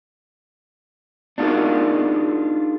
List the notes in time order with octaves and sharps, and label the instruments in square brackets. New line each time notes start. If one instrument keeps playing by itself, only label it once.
[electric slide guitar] D4 D#4 F4 F#4 G#4 A#4